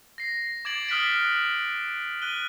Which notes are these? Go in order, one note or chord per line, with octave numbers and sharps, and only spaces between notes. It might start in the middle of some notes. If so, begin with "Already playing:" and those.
A#6 C7
D6 G#6 A6 D7 F#7
D#6 F6 F#6 A6 B6 D7
F#6 D#7 G7